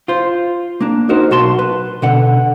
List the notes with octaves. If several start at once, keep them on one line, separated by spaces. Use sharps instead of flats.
F4 C5
A#3 D4
D#4 F#4 A#4 C5
B1 F#4 A5 C6
B4
B2 D3 F#5